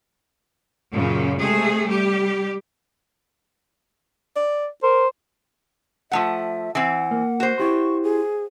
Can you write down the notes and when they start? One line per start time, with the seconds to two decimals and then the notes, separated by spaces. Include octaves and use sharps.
0.92 F#2 A#2 C#3
1.39 C3 G#3 A3 G#4
1.85 G3 G4
4.36 D5
4.83 A#4 C5
6.12 F3 A3 E5 F#5
6.75 E3 C4 F#5
7.11 A#3
7.40 F#4 C5
7.58 E4 G4 C6 C#6
8.03 G#4